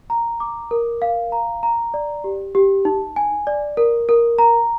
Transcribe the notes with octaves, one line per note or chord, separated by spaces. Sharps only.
A#5
D6
A#4
F5
A#5
A#5
D5
G4
G4
D#4
G#5
D5
A#4
A#4
A#5